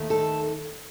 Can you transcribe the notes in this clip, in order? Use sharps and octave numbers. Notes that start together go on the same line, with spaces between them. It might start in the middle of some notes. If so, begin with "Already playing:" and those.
Already playing: D#2 D#3 A3
A4